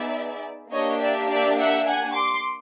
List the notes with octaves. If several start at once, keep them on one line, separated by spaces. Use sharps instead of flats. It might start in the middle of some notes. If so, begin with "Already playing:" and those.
Already playing: B3 D#4 G#4 D5 E5
A#3 D4 G4 C#5 D#5
D5 E5
D5 E5
E5 F#5
F#5 G#5
C6 D6